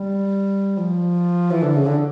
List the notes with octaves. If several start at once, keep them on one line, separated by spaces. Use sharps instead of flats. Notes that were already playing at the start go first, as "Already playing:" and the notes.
Already playing: G3
F3
E3
D3
C#3
D3